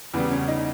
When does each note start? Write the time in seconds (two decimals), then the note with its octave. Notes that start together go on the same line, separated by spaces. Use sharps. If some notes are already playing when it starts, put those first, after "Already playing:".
0.14 E2 C#3 G3 B3
0.31 C#4
0.48 D#4